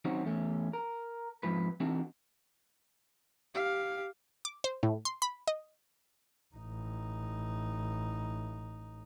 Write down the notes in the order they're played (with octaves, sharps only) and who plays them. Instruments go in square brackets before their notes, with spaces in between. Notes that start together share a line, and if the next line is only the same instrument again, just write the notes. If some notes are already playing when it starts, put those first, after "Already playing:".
[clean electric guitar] D#3 F#3 C4 C#4 D#4 F#4
E2 A3 C#4
A#4
F2 G#2 F3 B4
E3 C4 D4 D#4 F#4 A4
[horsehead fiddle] G4 F5
[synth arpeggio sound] D6
C5
A2
C6
B5
D#5
[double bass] A1 D#4